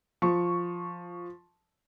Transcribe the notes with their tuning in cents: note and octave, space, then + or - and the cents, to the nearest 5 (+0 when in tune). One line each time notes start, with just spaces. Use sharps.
F3 +0 C#6 +0